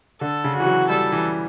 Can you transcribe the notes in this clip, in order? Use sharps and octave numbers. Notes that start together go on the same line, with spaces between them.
D3 A4
C#3
E3 F#4
F#3
G3 A4
E3